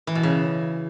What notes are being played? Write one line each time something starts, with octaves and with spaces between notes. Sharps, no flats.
E3
B2
C#3